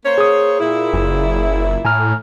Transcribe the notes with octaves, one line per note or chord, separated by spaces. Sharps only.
A#3 C5 C#5
G#4 D#6
A#2 E4
F#1
A2 G#5 A#5 F6